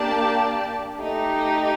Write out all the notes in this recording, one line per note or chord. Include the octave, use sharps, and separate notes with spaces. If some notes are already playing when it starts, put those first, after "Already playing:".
Already playing: A#3 D4 G4 D5 A5
A3 D#4 G4